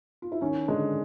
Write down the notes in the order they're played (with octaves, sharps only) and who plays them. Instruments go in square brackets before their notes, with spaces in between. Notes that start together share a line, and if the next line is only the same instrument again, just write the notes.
[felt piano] F4
E4
[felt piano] D#3 D#4 [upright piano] C#4
[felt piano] D3 D4 [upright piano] G#3